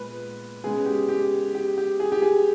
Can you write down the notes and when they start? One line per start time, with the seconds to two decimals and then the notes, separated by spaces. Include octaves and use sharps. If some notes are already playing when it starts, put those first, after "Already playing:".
Already playing: A#2 G#3 B3 B4
0.64 C#3 G#3 B3 G#4
0.86 G4
1.09 G4
1.55 G4
1.78 G4
2.00 G#4
2.12 G4
2.22 G#4